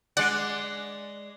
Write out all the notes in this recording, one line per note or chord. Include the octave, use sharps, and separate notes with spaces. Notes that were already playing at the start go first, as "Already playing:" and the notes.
G#3 D5 F#5